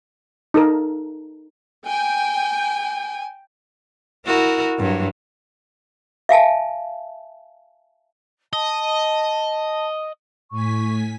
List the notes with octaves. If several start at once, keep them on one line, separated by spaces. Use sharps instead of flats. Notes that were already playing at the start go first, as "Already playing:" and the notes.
D#4 A4 A#4
G5 G#5
E4 F#4 A#4
G2 F#3
E5 F5 G#5 A5
D#5 A5
A2 G#5 C#6 B6